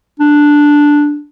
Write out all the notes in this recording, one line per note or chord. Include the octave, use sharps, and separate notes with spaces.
D4